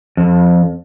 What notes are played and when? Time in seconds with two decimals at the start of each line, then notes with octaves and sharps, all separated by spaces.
0.17 F2